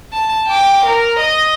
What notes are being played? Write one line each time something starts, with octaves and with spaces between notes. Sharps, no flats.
A5
G5 D6
A#4
D#5